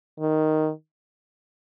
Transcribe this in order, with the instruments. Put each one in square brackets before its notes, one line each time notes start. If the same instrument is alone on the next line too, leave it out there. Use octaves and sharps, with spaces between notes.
[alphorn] D#3